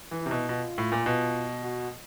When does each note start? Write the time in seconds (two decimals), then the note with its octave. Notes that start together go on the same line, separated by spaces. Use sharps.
0.11 E3
0.21 E4
0.26 C3
0.31 B2
0.49 B2 F4
0.78 A2
0.92 A#2
1.06 B2
1.63 F#4